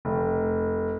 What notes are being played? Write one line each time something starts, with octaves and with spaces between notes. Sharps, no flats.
F1